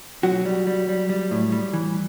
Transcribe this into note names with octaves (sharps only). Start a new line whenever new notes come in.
B1 F#3 F#4
G3
G3
G3
G3
A2
G3
E3